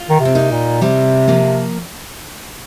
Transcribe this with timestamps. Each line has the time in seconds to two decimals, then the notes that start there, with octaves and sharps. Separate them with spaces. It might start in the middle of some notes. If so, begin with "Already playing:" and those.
Already playing: F4
0.09 D#3
0.20 C3
0.25 C4
0.35 A#3 D#4
0.51 A#2
0.81 C3 G3 C4
1.28 F3 A#3